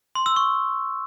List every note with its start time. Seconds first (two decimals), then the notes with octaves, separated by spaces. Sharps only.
0.15 C6
0.26 E6
0.36 C#6